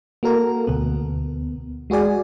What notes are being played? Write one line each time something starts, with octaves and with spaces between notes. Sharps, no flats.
A#3 F#4 A4 A#4
D2 B2 B3
G#3 F#4 G#4 D5 G#5